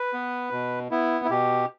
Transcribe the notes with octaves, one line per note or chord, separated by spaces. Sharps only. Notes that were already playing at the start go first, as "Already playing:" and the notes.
Already playing: B4
B3
B2
B3 E4
E4
B2 G4